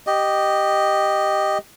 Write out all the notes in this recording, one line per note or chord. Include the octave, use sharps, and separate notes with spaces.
G4 D#5